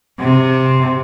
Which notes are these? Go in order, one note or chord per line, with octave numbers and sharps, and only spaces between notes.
C3